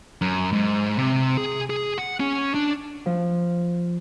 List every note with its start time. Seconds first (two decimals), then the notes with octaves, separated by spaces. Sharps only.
0.22 F#2
0.53 G#2
0.98 C3
1.37 G#4
1.70 G#4
1.98 F#5
2.20 C#4
2.54 D4
3.06 F3